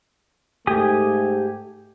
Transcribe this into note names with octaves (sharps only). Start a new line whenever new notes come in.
G#2 A3 G4 G#5 D#6